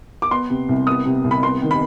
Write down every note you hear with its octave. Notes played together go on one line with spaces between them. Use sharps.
D6
B3 C6
C3
C2
B3 D#6
C3
C2
B5
B3 C6
D#3
B5